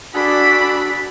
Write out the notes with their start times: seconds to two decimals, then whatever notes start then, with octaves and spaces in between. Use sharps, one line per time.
0.14 D4 F#4 G#4 A4 F#5 B5